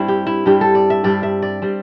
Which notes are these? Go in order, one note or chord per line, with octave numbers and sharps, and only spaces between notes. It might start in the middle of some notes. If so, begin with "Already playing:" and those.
Already playing: G2 G3 C4 E4
G4
E4
G2 G3 C4 G4
A4
D5
E5
G2 G3 C4 D5
E5
D5
G3 C4